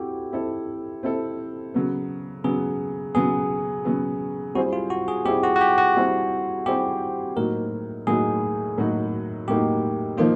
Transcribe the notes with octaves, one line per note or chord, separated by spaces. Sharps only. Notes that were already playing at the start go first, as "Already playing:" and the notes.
Already playing: C4 E4 F#4 G4 A4
C4 E4 A4
C4 E4 A4
C#3 F#3 B3
C#3 F#3 B3 G#4
C#3 F#3 B3 G#4
C#3 F#3 B3
G3 C4 E4 F#4 G#4 C5
F4
F#4
G#4
G3 C4 E4 G4 G#4 C5
F#4
F#4
G4
F#4
G3 C4 E4 G#4 C5
G3 C4 E4 G4 G#4 C5
A2 F#3 A#3 D#4 F#4 A#4
A2 F#3 A#3 D#4 F#4 G#4
A2 F#3 A#3 D#4 F#4
A2 F#3 A#3 D#4 F#4 G4
F3 A#3 D#4 F4